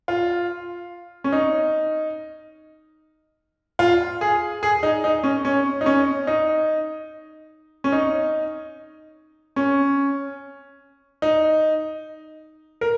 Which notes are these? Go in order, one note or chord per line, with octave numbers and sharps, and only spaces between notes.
F4
C#4
D#4
F4
G#4
G#4
D#4
D#4
C#4
C#4
D#4
C#4
D#4
C#4
D#4
C#4
D#4
A#4